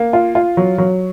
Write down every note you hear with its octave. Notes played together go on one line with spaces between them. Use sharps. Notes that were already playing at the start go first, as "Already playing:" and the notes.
Already playing: A#3
F4
F4
F#3
F#3